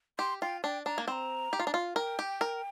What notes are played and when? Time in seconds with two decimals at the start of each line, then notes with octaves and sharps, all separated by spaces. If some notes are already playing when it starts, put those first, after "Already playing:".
0.19 G4 C6
0.42 F4 G5
0.63 D4 G5
0.86 D4 A#5
0.98 A#3
1.07 C4 A#5 C6
1.53 G4
1.59 F4
1.67 D4
1.74 F4
1.96 A#4 G5
2.19 G4
2.41 A#4